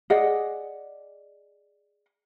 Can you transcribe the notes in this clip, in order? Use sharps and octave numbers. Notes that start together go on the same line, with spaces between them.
G#4 D5 D#5 F#5